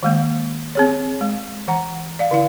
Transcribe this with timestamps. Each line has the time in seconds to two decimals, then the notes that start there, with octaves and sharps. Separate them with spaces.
0.03 D#3 G#3 A#3
0.75 C4 G#4 C#5
1.21 G#3
1.68 E3 F#5 A#5
2.19 D5 F5
2.31 D3 E4 F5